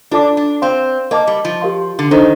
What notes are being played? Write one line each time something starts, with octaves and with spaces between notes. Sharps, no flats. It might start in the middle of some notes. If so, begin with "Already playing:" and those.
D4 F4 A4 D5 A5 D6
D4
C4 C5 F5 C6
A#3 A#4 D#5 A5 D6
G3
F3
G4 A#4 F5 C6
D3
D#3 D4 A4 C5 D#5